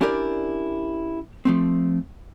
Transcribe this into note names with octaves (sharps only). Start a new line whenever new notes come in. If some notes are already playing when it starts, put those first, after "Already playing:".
C#4 D4 E4 G4 A#4 D5
F3 A3 C4